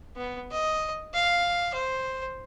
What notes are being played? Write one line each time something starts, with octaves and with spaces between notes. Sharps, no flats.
B3
D#5
F5
C5